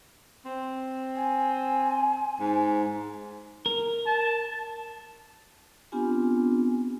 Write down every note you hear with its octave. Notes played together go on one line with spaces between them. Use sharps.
C4
G#5
G#2
A#4
A5
B3 C4 D4 F4 G4 G#5